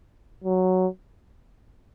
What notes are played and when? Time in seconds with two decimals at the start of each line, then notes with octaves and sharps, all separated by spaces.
0.44 F#3